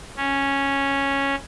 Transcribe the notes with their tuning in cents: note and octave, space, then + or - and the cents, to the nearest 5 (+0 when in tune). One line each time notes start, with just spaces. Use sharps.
C#4 -5